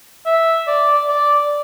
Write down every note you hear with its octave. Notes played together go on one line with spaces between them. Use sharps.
E5
D5
D5